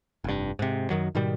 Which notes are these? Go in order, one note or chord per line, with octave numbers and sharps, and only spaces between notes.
F1 G2
G#2 C3
F#2 D#3 F#3
G#2 B2 D#3 G3